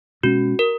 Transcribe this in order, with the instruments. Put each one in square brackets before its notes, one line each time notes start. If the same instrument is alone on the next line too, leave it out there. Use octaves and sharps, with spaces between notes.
[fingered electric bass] B2 G#3 C#4 [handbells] F#4
[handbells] A#4